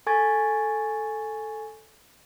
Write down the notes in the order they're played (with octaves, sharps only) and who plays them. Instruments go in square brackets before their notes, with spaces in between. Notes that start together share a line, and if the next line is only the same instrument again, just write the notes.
[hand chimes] A4 G#5 C#6 G#6 A6